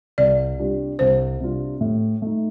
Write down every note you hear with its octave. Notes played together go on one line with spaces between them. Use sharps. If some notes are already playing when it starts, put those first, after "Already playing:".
C2 D5
C3 G3 D4 F4
C2 C5
C3 G3 D4 F4
A2
A3 D#4